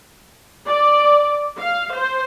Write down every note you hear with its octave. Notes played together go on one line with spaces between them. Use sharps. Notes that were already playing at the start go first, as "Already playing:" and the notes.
D5
F5
C5